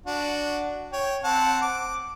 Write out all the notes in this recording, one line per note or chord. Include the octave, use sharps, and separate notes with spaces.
D4 F#4
C#5 G5
C4 F#5 A5
D6